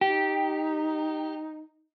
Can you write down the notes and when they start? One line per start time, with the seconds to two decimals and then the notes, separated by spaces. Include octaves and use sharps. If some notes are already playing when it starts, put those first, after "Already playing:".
0.01 D#4 G4